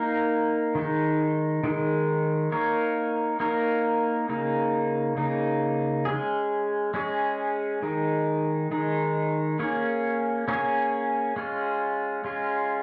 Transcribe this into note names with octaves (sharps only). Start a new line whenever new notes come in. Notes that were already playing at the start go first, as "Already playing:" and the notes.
Already playing: A#3 D#4 A#4
D#3 G#3 D#4
D#3 G#3 D#4
A#3 D#4 A#4 C#5
A#3 D#4 A#4 C#5
C#3 A#3 D#4
C#3 A#3 D#4
G#3 C#4 G#4
G#3 C#4 G#4
D#3 G#3 D#4
D#3 G#3 D#4
A#3 C#4 G#4 C#5
A#3 C#4 G#4 C#5
G#3 C#4 F4
G#3 C#4 F4